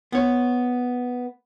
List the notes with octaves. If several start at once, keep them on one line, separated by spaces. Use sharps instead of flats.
B3 C#5